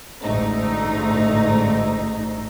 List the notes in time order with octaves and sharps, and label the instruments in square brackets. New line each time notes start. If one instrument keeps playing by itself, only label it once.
[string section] A1 D2 G#2 A3 D#4